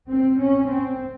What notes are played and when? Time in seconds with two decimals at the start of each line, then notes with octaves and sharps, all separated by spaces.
0.09 C4
0.40 C#4
0.68 C4